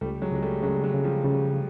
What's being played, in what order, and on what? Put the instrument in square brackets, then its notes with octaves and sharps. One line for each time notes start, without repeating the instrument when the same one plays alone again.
[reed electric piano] C#2 [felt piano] G3 A3
[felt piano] F#3 G#3
[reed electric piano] C#2 [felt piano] G#3
[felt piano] G3 A3
[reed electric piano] C#3 [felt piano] F#3 G#3
[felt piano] F#3 G#3
[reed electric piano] C#3
[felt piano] F3 G3
[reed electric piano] C#3